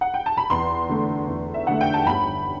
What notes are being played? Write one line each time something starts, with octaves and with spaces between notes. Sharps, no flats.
F#5
G5
A5
B5
E2 C6
D3 A3
E2
E5
D3 A3 F#5
G5
A5
G1 B5